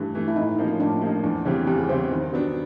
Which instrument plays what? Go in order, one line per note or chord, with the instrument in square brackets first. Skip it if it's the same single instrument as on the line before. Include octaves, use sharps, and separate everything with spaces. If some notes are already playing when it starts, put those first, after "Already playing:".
Already playing: [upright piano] G2 E3 A3
E3 A3
[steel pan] E4
[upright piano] A2 [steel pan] D#4
[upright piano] F3 A#3 D#4
[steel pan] C#4
[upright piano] A2 [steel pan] D4
[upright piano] F3 A#3 D#4
[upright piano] E2 [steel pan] D4
[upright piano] C#3 E3 G3 C4
[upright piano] E2 [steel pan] G4
[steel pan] G#4
[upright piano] C#3 E3 G3 C4 [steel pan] C5
[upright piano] D#3
F#3 B3 D4